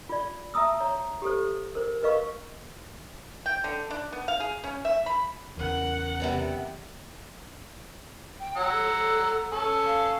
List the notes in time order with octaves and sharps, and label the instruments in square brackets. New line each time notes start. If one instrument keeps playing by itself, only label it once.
[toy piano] F4 D5
E5 A5 A#5 D#6 E6
C#5 A#5
G4 A4 C5
A#4 C5
A#4 B4 D#5 F5 C#6
[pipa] G5
D3
D4
B3
F5
G#4
C#4
E5
B5
[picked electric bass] E2 C#3 [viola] A#4 F#5
[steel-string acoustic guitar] C3 G3 B3
[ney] G5
[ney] C#5 [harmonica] F#5 A#5 E6
[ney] A4
[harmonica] C#4 A4
[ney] F5